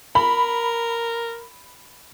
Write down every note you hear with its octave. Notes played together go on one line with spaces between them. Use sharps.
A#4 B5